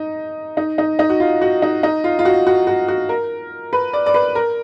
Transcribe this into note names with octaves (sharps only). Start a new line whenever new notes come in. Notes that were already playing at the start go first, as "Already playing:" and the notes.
Already playing: D#4
D#4
D#4
D#4
F#4
F4
F#4
D#4
D#4
F4
F4
F#4
F#4
F#4
F#4
A#4
B4
D5
D5
B4
A#4